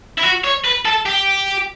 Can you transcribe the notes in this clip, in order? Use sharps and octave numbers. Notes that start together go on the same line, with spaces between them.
E4
F#4
C#5
B4
A4
G4